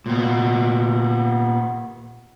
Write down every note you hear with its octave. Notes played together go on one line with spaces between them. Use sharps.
A#2 B3